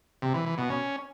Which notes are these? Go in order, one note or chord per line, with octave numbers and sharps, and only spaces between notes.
C3
E3
E3
B2
C#4